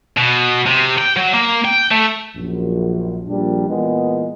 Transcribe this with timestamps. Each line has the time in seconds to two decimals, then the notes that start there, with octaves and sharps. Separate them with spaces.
0.18 B2
0.67 C3
0.98 G5
1.16 F#3
1.33 A#3
1.65 G5
1.91 A3
2.36 A#1 F#2
3.28 A#1 A#2 G3 D4
3.68 A#2 E3 G#3 B3